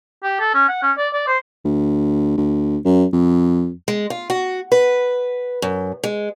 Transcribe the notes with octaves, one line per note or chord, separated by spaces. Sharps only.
G4
A4
C#4
F#5
C#4
D5
D5
C5
D2
D2
F#2
F2
G#3
F4
F#4
B4
F#2
G#3